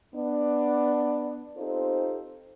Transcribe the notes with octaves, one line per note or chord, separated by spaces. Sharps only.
B3 D4 D5
C4 D#4 F4 G4 A4 C5